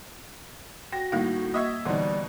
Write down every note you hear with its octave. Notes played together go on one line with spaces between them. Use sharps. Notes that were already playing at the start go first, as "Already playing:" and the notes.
F#4 G5 A#6
A2 D#3 G3 A#3 F5
A#3 D#5 E5 C#6 G#6
B2 D3 E3 G3 D#4 F#5